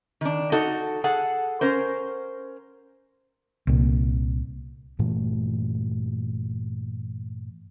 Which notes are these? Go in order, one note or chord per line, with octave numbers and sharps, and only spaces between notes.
D#3 D4
D#4 F#4 A4
G#4 A4 F#5
C#4 A#4 C5
C2 A#2
G2 A#2 E3 A3